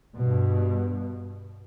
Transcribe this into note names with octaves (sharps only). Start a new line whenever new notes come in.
G2 B2